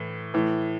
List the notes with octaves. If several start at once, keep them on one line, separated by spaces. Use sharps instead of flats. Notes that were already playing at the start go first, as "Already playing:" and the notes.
Already playing: A2 E3
A2 E3